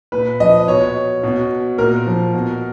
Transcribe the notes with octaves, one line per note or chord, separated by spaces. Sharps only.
A#2 B4
F3 D#5
B2 C#5
B2
A#2 A#4
F3
B2